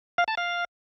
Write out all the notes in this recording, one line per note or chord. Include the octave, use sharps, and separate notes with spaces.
F5
A5
F5